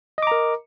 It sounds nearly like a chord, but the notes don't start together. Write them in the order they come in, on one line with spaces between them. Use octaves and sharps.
D#5 D6 A#5 A#4